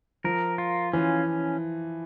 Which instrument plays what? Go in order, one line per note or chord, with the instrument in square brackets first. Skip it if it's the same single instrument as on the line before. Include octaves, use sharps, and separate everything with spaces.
[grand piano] F3 [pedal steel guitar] A#4
[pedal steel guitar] F4
[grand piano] E3 [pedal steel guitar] C#4